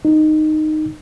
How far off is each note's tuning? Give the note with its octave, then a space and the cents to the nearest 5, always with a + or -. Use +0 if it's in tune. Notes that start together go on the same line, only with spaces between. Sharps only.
D#4 -10